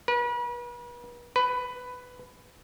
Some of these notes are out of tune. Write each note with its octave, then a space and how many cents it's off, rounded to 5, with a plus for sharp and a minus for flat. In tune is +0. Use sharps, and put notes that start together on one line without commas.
B4 -40
B4 +10